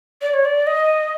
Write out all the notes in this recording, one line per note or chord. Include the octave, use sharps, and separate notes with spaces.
D5
C#5
D5
D#5